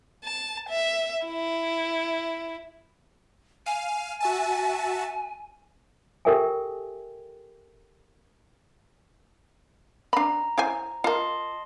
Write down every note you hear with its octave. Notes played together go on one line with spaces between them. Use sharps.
A5
E5
E4
F5 G#5
F#4 E5 A5
G4 A4 A#4 E5 G5 G#5
D4 A#5 B5
E4 C5 G#5
F4 A#4 D#5 A5 C6